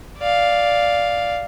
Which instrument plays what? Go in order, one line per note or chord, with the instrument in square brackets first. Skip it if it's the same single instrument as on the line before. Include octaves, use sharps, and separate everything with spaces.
[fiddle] D5 F5